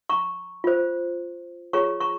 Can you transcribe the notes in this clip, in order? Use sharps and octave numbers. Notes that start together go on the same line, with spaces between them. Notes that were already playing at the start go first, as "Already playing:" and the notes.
A#5 C#6
F4 C5
F4 G#4 C#5 A#5 C#6
A#5 C#6